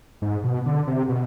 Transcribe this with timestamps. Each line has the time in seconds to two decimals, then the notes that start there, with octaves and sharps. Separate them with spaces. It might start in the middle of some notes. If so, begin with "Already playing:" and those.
0.22 G#2
0.44 B2
0.66 D3
0.87 C3
1.09 B2